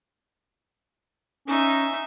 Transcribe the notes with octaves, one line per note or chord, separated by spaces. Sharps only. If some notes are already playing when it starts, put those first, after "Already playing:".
C#4 D#4 E5